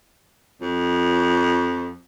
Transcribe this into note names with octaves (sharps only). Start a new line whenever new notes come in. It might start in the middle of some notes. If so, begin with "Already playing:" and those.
F2 F3